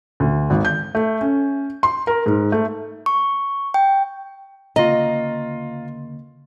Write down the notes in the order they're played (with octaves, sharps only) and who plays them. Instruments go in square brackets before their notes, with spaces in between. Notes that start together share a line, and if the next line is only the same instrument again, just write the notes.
[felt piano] D2
G#1
G6
A3
C#4
C6
A#4
G#2
A3
[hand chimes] C#6
G5
[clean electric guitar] D2 C#3 A#3 [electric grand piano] F4 A#5 [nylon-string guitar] D#5